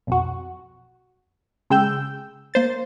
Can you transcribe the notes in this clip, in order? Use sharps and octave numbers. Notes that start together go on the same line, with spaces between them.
B1 F2 F#4
C#3 G#3 G5 E6 G6
A#3 C5 A6